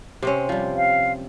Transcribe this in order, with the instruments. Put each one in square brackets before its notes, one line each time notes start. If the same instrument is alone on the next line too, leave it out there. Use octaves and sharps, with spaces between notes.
[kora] C3 C4 C#4
F3 G3
[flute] F5